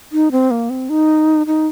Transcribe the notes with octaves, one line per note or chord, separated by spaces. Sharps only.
D#4
C4
A#3
C4
D#4
D#4